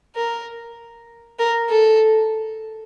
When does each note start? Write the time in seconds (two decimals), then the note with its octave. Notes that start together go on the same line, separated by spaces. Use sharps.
0.16 A#4
1.39 A#4
1.70 A4